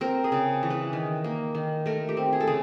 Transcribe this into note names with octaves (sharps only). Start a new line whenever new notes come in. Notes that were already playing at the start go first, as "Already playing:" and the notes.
C4 A#4
G#4
C#3
E3
B4
D#3
A#3
D#3
A3 A#4
G4
C4
G#4
A4
C#3 G#4